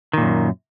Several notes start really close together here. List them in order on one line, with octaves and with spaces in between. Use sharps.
D#3 A#2 F#2